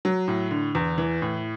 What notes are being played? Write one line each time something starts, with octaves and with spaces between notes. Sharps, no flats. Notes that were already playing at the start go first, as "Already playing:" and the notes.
F#3
A2
D3
E2
E3
A2